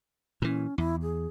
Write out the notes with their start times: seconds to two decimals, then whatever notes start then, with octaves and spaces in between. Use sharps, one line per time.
0.42 A#2 E3 C#4
0.78 E2 E4
1.02 G#4